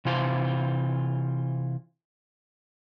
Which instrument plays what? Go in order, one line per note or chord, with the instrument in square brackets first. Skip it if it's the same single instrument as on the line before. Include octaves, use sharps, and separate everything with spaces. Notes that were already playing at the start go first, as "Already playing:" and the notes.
[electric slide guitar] C3 E3 F4 C5